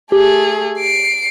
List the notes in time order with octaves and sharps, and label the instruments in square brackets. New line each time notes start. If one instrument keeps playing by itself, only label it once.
[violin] A3 G#4 [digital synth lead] G4
[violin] C7 D7